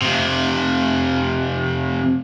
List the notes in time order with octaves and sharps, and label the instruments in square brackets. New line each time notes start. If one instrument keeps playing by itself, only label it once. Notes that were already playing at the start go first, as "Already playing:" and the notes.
[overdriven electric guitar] F2 C3